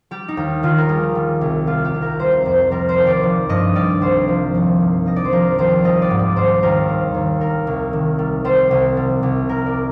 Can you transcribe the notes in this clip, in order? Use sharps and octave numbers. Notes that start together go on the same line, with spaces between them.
G3 G4
D#4
D#2
D#3 F4
A#4
G3 G#4
G3
C2
G3 F4
G4
C2
A#4
G3 C5
F2 C5
G3 A#4
C5
D#2
D5
F3
G2 D#5
G3 D5
C2 C5
F3
D#2
G2
F3 D#5
D5
C5
F3 A#4
D#2 C5
G3 D#5
D5
G#2
D5
G3 C5
D#2 A#4
G3
D#2
G3 A#4
C2
D#3
G3
G3 C5
C2
G3
C2
G3 A#4
D5